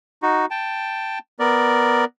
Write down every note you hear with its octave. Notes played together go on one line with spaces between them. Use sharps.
D#4 F#4
G5 A5
B3 A#4 D5